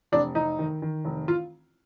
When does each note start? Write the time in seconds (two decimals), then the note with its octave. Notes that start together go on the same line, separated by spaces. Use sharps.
0.12 F1 D4
0.35 F1 D#4
0.59 D#3
0.82 D#3
1.05 F1
1.28 F4